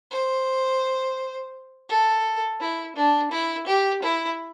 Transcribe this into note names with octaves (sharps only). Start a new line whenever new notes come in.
C5
A4
E4
D4
E4
G4
E4